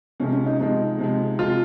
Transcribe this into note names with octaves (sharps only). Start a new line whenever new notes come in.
C3 F3 G#3 C#4
C#4
D#4
C3 F3 G#3 D#4
C3 F3 G#3
C3 F3 G#3 F4